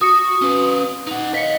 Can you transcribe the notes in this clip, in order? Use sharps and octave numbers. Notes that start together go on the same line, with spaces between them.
F#4 D#6 C#7
C#4 B4
D#4 F#5
D#5 F5 B6 C#7